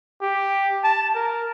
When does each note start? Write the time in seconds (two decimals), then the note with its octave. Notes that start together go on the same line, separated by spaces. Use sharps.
0.22 G4
0.84 A5
1.15 A#4